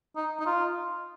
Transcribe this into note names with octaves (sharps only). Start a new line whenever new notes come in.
D#4
D#4
F4